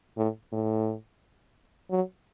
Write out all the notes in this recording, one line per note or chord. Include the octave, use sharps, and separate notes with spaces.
A2
A2
F#3